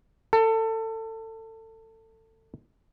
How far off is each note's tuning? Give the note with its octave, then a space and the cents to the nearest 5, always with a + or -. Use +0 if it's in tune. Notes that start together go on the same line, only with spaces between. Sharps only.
A4 +25